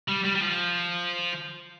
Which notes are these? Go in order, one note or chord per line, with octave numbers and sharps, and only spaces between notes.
G3
G3
G3
F3